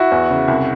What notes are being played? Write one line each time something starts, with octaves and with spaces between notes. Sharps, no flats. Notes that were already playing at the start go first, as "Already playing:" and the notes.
Already playing: E4 F#4
E2
C#3
C2